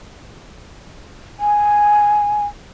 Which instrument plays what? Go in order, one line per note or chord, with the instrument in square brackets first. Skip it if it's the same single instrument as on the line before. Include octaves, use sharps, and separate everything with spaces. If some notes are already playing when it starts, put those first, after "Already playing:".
[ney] G#5